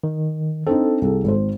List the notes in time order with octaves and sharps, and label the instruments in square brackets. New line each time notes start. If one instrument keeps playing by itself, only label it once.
[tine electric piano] D#3
[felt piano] C4 D4 D#4 [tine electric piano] A4
[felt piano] C2 G#4
G#1 C5